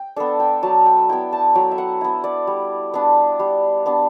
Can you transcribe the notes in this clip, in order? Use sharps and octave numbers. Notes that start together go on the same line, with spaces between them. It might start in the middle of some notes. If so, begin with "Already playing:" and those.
Already playing: G5
B3 D4 A4
G5
F#3 A5
G5
B3 E4 G5
A5
F#3 G5
E5
F#5
B3 E4
D5
G3
B3 D4
G3
B3 D4